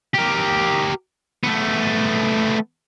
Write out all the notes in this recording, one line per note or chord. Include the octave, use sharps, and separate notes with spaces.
G4 A#4
A3 B3